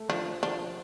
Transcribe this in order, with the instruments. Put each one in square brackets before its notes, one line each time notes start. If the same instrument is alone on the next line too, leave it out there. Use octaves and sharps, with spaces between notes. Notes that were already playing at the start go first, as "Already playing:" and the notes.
Already playing: [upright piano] A3
[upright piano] F3 [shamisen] D4 F4
[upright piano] F3 [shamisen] D4 F4